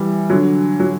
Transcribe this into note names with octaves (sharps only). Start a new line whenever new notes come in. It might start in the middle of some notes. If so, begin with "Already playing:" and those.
Already playing: E3 G3
D3 F#3
F#3